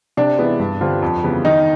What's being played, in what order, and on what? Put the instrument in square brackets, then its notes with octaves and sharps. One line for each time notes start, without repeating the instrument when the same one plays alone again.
[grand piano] C3 [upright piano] D4
[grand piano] E3 G#3 B3 E4
G2
D3 G3 C4 F4
F2
C#3 E3 G3 B3
[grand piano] D#3 [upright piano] D#4